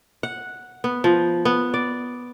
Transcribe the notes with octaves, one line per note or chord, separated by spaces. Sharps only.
F#5
B3
F3
B3
D5